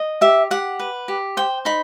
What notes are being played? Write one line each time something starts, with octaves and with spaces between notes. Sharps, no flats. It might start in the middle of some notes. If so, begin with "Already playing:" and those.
Already playing: D#5
G4 E5
G4 F#5
B4
G4
C5 G5
D#4 B5